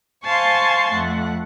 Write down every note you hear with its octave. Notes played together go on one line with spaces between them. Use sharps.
C5 F5 G#5 A5 C6 C#6
F2 A3 F#5